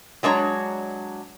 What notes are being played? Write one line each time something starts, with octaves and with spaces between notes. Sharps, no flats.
F#3 G#3 D4 C#5 A#5